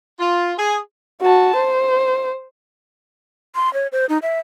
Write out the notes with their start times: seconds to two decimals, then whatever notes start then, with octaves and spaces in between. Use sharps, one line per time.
0.19 F4
0.58 G#4
1.22 F#4 A5
1.56 C5
3.55 C6
3.74 C#5
3.92 C5
4.09 D#4
4.22 E5